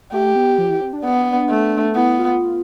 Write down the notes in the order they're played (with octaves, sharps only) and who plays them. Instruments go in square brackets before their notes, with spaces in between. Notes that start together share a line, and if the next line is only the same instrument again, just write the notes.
[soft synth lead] A3 [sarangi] G4
[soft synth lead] B3
F3
E3
C4
D4
[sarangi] B3
A3
[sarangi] B3 [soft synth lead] E4
[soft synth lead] F4